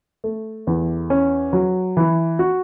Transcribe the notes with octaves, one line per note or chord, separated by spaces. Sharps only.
A3
E2
C#4
F#3
E3
F#4